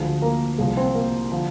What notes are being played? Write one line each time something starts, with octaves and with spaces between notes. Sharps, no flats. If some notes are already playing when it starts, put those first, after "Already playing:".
Already playing: D2 D3 F3 G#3 G#4
A#3 A#4
C2 A#2 F3 G#3 G#4
C4 C5
A#3 A#4
D3 F3